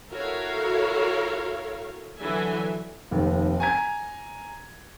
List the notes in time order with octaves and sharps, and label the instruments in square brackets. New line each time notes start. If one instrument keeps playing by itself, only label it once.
[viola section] E4 F#4 A4 A#4 C#5 F5
D3 E3 F#3 E4 E5 G#5
[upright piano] F1 D#2
G#5 A#5 G#6